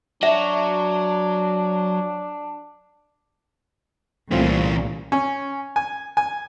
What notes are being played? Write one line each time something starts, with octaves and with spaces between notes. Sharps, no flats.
F#3 D4 E5
C2 A#2 E3 A3 C4 C#4 F4
C#4
G#5
G#5